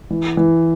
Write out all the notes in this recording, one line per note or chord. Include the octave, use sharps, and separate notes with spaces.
E3
E3